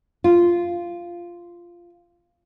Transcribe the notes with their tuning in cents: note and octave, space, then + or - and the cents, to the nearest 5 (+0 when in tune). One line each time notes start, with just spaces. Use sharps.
F4 -10